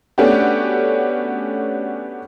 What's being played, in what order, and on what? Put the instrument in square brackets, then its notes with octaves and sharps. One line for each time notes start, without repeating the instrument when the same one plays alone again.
[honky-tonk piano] A3 B3 C#4 D4 F#4 G4